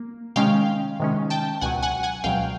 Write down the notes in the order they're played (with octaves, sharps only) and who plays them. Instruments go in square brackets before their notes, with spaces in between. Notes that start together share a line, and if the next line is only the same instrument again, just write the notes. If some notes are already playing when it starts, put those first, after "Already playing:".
Already playing: [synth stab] A#3
C3 D#3 G#3 C#4 F5 G5
C3 D#3 G#3 C#4
G5 A5
C#2 B2 F#3 F#5 G#5
F#5 G#5
F#5 G#5
C#2 B2 F#3 F5 G5